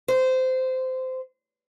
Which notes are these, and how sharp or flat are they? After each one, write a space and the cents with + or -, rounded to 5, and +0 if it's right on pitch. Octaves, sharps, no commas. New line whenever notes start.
C5 -20